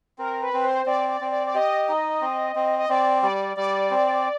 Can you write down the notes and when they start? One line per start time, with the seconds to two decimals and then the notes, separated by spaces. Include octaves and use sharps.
0.18 C4 A#4
0.41 B4
0.53 C4
0.64 C5
0.86 C4 D5
1.09 D5
1.21 C4
1.32 D5
1.46 D5
1.54 G4 D#5
1.88 D#4
2.22 C4
2.55 C4
2.79 D#5
2.89 C4 D5
3.22 G3 D5
3.57 G3 D5
3.91 C4